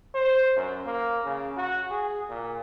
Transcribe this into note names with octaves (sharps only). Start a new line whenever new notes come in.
C5
F#2
A#3
C#3
F#4
G#4
A#2